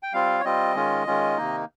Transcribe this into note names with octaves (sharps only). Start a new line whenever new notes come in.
G5
G3 C4 F4 F5
C#5
G3 C4 F4 D#5
D#3 G#3 C#4 F4
D#3 G#3 C#4 F4
C3 D#3 A#3 D#4